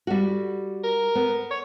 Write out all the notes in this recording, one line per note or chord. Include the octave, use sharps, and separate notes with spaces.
G3 F#4
A#4
B3
C#5